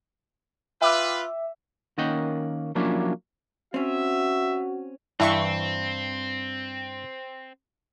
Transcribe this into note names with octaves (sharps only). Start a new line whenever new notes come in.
F4 B4 E5 G5 D6 E6
D#3 A#3 C#4 D#5 F#5 G5
F3 F#3 A#3 C#4 D4 E4
C4 C#4 F#4 E5
G2 E3 C4 E5 C#6